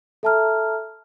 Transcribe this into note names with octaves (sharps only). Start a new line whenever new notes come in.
A4 E5 A5 A#5 F6